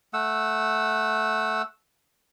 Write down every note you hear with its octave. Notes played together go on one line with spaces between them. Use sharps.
A3 F#5 E6